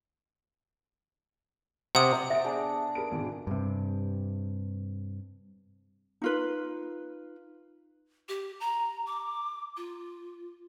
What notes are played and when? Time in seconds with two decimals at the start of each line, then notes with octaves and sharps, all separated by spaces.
1.95 C3 F#5 D#6
2.30 E5 G5 A6 D7
2.44 B3 D4 G#4
2.95 G#4 A#4 B4 D7
3.12 G#1 B2 D3
3.47 G2 C3
6.22 D#4 F4 B4
8.29 G4
8.60 A#5
9.06 D6
9.77 F4